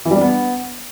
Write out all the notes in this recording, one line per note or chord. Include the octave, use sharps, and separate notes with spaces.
E3
G3
D4
B3